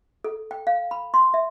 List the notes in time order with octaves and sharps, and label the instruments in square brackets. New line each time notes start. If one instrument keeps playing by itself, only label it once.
[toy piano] A4
G5
F5
B5
C6
E5